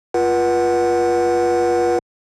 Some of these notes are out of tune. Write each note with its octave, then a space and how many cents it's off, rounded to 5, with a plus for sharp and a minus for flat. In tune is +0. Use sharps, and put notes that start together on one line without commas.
F4 +0 B4 -35 F#5 +5